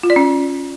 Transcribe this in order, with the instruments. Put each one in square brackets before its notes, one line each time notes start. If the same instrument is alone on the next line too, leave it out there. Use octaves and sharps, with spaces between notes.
[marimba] F4
D5
C#4